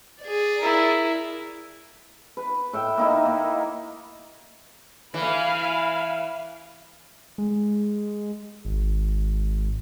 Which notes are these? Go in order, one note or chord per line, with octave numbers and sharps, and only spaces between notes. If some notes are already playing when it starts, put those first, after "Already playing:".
G#4 D5
E4 A#4
B4
A2 E5 G5
A#3 D#4 E4
A#3
E3 F5 G#5 B5
G#3
G#1